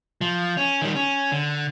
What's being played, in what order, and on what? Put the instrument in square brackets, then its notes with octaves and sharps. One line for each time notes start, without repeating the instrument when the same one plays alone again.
[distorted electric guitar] F3
C#4
D#3 G3
C#4
D3